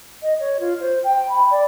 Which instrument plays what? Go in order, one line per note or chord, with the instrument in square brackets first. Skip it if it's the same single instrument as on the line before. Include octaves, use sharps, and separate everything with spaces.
[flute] D#5
C#5
F4
C5
G5
B5
D5